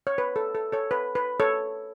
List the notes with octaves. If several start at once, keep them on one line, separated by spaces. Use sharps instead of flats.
C#5
B4
A4
A4
A4 C#5
B4
B4
A4 C#5